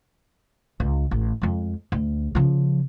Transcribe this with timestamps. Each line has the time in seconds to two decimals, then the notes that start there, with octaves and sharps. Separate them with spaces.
0.80 C#2
1.11 A1
1.42 F2 G#3
1.92 D2
2.35 C#3 F3